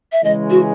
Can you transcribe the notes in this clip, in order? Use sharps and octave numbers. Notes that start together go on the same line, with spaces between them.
E5
C#3 E3 G#3 D#5
F#4